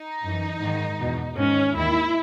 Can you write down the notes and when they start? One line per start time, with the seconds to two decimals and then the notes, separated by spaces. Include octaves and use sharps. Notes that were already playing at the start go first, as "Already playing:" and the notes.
Already playing: D#4
0.22 F#2 E3
0.60 G#2 D#3
0.99 E2 B2
1.37 G#2 D#3 C#4
1.76 D#2 D#3 E4